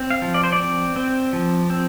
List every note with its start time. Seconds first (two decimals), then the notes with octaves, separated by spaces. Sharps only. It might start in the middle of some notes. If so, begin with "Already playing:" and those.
Already playing: C4
0.11 F5
0.22 F3
0.34 D5
0.44 C5
0.52 D5
0.59 C4
0.96 C4
1.33 F3
1.70 C4